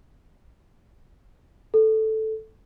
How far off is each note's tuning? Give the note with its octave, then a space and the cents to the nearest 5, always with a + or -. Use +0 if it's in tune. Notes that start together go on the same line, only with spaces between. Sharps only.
A4 -5